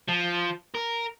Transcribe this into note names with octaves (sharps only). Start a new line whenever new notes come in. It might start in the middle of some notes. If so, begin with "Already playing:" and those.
F3
A#4